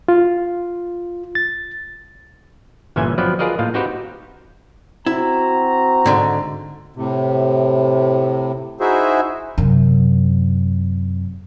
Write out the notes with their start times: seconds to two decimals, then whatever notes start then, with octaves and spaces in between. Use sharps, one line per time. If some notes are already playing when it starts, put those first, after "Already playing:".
0.08 F4
1.35 A6
2.96 G1 A#2 E3 C#4 E5 G#5
3.18 F3 F#3 B3 C4 B4 D5
3.39 F4 G#4 A#4 B4 D5 D#5
3.59 A2 A#3 F4
3.74 C4 D#4 F#4 G4 B4 C5
5.06 C4 E4 F#4 A#5
6.06 G#2 D3
6.96 A2 C3
8.80 D#4 E4 F#4 G#4 C5 E5
9.58 F#2 C3